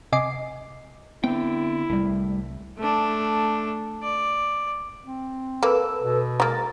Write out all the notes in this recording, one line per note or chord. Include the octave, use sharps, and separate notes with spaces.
C3 D#5 G#5 D6 C7
D3 B3 C4 E4 G5
C2 A2 G3
A3 D4
D5
C4
A#3 A4 B4 E6
B2
G#3 A#3 A#5 A6